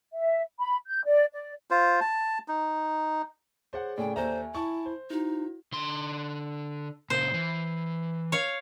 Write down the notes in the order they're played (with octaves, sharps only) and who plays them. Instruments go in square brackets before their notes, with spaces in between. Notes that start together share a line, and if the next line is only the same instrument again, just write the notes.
[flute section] E5
B5
G6
D5
D5
[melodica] F4 C5
A5
D#4
[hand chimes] G#4 C#5 [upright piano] C5 F#5
[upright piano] A2 C#3 [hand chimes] D5 G#5 [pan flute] G5
[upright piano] D#2 A4 A#5 [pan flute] C5 [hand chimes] E5 G#5
[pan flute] E4 [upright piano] A5 C#6
[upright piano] C5
[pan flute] D#4 [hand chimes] E4 F#4
[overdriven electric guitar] D3 C6
[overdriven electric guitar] A#2 C#3 [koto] C5
[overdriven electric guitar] E3
[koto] C#5 F5